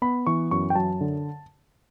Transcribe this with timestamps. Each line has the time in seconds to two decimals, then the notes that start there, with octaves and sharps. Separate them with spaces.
0.02 B3 B5
0.27 E3 C#6
0.51 F#2 C#6
0.70 G5
0.75 F#3 A5
1.01 D3